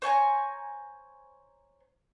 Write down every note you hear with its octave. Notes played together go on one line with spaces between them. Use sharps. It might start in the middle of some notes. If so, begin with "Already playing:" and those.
C5 C#5 G#5 A#5